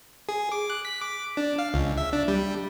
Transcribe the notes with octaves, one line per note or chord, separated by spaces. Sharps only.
G#4
D6
F#6
B6
D6
D4
F5
C#2
E5
D4
G3